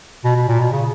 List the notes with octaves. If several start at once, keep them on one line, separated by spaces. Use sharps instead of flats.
B2
B2
A#2
B2
C#3